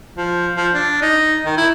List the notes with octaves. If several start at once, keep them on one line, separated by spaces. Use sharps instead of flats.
F3
F3
D4
D#4
D#3
E4